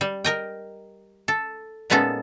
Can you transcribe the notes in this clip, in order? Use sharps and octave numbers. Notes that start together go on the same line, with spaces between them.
G3
A#4 D#5 G5
A4
A#2 G#3 B3 C#4 D#4 A4